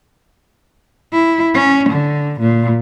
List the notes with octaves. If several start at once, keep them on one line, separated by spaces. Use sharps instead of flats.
E4
C#4
D3
A#2